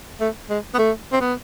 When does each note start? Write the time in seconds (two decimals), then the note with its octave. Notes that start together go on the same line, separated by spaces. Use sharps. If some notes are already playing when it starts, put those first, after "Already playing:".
0.21 A3
0.50 G#3
0.74 B3
0.78 A3
1.12 C4
1.21 B3